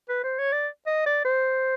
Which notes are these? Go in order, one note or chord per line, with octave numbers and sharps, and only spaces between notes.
B4
C5
C#5
D5
D#5
D5
C5